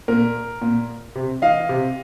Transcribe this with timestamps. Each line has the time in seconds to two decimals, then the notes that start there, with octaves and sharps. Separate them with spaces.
0.08 A#2 A#4
0.62 A#2
1.15 C3
1.42 E3 D#5 F5
1.69 C3